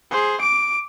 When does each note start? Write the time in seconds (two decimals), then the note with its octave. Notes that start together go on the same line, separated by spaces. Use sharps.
0.11 G#4 C5
0.41 D6 D7